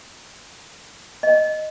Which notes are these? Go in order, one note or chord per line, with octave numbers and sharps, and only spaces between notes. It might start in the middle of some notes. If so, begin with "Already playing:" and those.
D#5